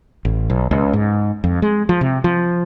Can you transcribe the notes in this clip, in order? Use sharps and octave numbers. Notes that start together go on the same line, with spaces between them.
A1
B1
C#2
G#2
F2
G#3
F3
C3
F3